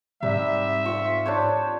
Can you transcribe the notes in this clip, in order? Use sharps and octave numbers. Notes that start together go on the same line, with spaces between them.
G#2 C3 G3 E5
C4 F4 C#6
D4 C5 C#5